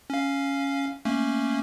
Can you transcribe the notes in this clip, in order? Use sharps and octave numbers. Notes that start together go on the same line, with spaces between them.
C#4 F5
A3 A#3 C#4